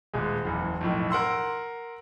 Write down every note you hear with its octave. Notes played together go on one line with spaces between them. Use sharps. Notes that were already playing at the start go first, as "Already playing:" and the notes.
D#1 G#3
F#1 E2
B1 F2 A2
A#4 F#5 C6 E6